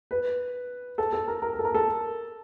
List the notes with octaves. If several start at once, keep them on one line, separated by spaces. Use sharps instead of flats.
B4
A4
A4
A#4
A#4
A#4
A4
A#4
A4